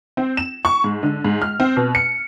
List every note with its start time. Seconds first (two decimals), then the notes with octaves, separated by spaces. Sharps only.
0.17 C4
0.37 E7
0.65 C#6
0.84 G#2
1.03 D3
1.24 G#2
1.42 F6
1.60 C4
1.77 B2
1.95 C#7